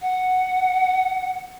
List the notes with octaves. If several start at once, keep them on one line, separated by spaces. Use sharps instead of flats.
F#5